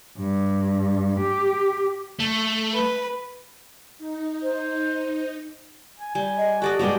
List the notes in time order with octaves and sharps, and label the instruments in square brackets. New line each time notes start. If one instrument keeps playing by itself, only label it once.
[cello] G2
G4
[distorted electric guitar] A3
[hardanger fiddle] B4
[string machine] D#4
[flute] C5
[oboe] G#5
[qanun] G3 [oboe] G#5
[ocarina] D#5
[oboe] F#4 [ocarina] G4 [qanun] A4 D5 D#5
[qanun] F#3 G5 [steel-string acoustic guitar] G#3 B3 F#4 [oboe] D5